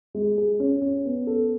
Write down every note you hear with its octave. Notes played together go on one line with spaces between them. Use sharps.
G#3
G#4
C#4
C#4
B3
A4